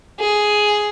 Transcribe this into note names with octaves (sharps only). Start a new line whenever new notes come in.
G#4